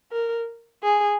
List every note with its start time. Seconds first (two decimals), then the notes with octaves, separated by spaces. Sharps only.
0.12 A#4
0.84 G#4